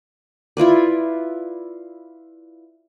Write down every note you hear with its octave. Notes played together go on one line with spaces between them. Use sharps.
E4 F4 B4 D5